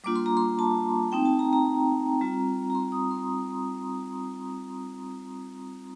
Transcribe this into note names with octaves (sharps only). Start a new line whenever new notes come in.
G3 A#3 D4 F4 D6
C6
A#5
C6
A5
A3 C4 D#4 G5
A5
A#5
A#5
G3 C4 F4
A#5
C6
D#6
C6